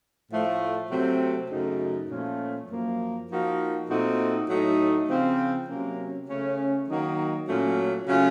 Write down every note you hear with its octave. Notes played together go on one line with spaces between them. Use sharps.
A2 F3 A3
C3 F#3 A3 C4
F#2 C#3 F#3 A3 D#4
A#2 F3 A3 C#4 F4
F#2 F3 A#3
F3 A#3 D#4 F#4
A#2 A3 C4 D#4 F#4
A2 F#3 A3 D#4
C#3 F3 C4
C3 F#3 A#3 C#4
C#3 A3 C#4
D#3 F#3 A#3 D#4 F#4
A#2 F#3 A3 C#4
C#3 F#3 A3 C#4 F4